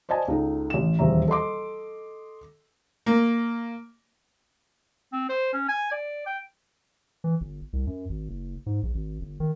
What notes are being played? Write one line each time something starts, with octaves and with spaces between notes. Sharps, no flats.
C5 D5 D#5 G#5 A5
C#2 D#4 A4
A1 E7
D#1 E2 E5 A#5
A4 D#5 C6 D6
A#3
C4
C5
C#4
G#5
D5
G5
E3
G1
C2
F#2
G#1
F#1
G#2
A#1
G#1
G1
D#3